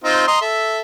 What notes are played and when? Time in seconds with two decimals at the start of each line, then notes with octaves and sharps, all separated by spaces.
0.04 C4 D#4 F4
0.28 D#5 A#5 C6
0.41 A4 E5